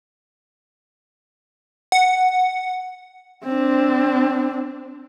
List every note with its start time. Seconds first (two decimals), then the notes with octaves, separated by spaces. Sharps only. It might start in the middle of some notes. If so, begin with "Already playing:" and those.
1.92 F#5
3.45 C4 D4